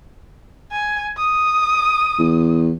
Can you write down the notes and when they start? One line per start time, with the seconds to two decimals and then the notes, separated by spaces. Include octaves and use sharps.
0.72 G#5
1.17 D#6
2.19 E2